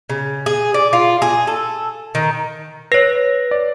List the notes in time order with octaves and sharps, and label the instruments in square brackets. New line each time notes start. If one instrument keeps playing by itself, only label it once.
[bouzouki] C#3
G#4
D5
F4
G#4
A4
D#3
[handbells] B4 C#5 [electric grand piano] A#6
[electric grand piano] D5